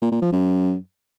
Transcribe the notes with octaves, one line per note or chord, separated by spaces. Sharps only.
A#2
A#2
F3
F#2